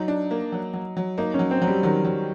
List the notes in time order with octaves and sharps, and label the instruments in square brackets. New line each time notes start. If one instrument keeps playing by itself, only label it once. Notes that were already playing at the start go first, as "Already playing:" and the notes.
Already playing: [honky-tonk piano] F#3 [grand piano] D#4
[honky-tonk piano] D4
A#3
F#3
F#3
F#3
[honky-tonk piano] A#3 [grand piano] D#4
[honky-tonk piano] F#3 [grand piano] C#4
[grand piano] C4
[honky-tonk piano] F#3
[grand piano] G3
[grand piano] D#3 [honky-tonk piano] F#3
[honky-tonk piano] F#3